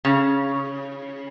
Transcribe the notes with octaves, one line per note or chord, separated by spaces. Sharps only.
C#3